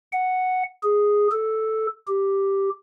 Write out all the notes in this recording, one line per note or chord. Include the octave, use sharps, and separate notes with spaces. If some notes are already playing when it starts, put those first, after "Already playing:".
F#5
G#4
A4
G4